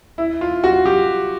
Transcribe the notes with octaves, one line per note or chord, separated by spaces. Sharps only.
E4
F4
F#4
G4